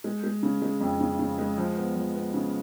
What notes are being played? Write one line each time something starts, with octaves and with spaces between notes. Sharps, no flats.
G#3
G#3
C#3
G#3
F2
C#3
C#3
G#3
F3
B3
F3
B3
C#3